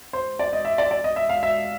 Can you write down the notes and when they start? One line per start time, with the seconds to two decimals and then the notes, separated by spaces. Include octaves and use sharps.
0.13 C5
0.39 D5
0.53 D#5
0.65 E5
0.78 D5
0.91 D5
1.04 D#5
1.16 E5
1.29 F5
1.43 E5